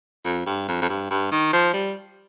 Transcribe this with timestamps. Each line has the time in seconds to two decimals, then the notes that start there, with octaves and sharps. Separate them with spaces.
0.25 F2
0.46 G2
0.68 F2
0.82 F2
0.89 G2
1.10 G2
1.31 D#3
1.53 F3
1.73 G3